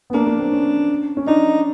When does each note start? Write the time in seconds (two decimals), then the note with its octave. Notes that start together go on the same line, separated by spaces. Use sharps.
0.10 B3
0.14 A#3 D4
0.27 A#3
0.40 C4
0.52 C#4
1.17 C#4
1.27 D4 D#4